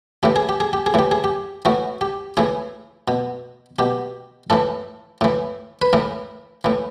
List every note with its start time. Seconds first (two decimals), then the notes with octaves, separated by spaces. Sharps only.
0.23 A2 E3 G4
0.36 G#4
0.49 G4
0.60 G#4
0.73 G4
0.86 G#4
0.94 A2 E3 G4
1.11 G#4
1.24 G4
1.65 A2 E3 F#4
2.01 G4
2.37 A2 E3 G#4
3.08 B2
3.79 B2 G4
4.50 A2 E3 A4
5.21 A2 E3
5.82 B4
5.93 A2 E3 A#4
6.64 A2 E3